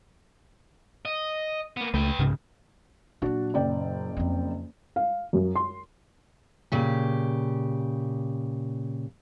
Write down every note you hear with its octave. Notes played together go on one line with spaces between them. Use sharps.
D#5
A#3 B3
C#2 A3 B4 G5
C2 G#2 C#3
A#2 F#3 D4 F#4
F#1 D5 G5
F2 C4
F5
F#2
C6
A#2 C#3 G4